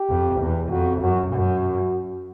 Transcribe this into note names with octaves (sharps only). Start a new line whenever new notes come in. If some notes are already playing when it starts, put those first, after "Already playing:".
Already playing: G4
F2
E2
F2 F#4
F#2 F#4
F#2 F#4